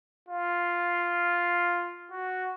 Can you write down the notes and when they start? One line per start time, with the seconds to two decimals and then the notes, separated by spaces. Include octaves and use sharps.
0.29 F4
2.11 F#4